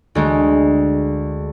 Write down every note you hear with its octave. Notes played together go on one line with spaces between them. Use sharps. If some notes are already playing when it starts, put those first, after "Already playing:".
D2 G#3